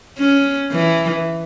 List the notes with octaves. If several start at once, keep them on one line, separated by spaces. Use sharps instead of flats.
C#4
E3